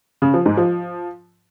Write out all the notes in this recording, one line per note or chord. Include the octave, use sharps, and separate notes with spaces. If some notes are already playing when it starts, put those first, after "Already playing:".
C#3
F3
G#2
F3